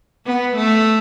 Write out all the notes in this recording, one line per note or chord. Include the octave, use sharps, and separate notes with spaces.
B3
A3